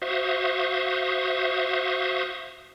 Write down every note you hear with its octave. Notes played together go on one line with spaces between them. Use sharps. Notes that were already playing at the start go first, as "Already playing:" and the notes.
F#4 C5 E5 F5 C#6 D#6